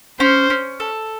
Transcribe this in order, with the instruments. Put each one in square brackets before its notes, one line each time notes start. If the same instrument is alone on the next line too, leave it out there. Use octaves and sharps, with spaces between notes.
[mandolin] C#4 [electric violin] C5
[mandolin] C#4
A4